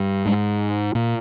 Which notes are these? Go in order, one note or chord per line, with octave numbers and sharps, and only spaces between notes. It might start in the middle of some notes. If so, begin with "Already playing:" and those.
Already playing: G2
G#2
A#2